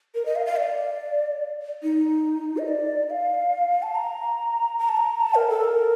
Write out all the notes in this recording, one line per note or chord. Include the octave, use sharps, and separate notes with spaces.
A#4
D#5
F5
F5
D5
D#4
D#5
D5
F5
A5
A#5
A#5
A5
A#5
A5
A#4
A4
A#4